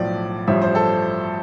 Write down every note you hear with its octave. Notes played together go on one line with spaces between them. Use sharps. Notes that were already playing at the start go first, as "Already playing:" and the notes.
Already playing: B1 A2 F3 D5
A1 G2 F3 E5
C5
A4